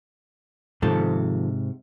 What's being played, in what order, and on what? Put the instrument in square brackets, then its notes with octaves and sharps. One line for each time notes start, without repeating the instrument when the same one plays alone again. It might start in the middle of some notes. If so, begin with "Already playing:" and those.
[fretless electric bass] G#2 C3 [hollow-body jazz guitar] D#3 F3 A4